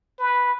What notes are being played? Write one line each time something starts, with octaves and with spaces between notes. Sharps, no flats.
B4